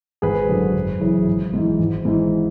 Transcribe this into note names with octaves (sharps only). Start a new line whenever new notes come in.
G#1 G#4 B4
F#2 D3 F#3
F#1
F#2 C#3 E3
G#1
G#2 E3
G#1
G#2 E3